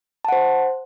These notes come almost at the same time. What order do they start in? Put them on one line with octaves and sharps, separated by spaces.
A5 F#5 C5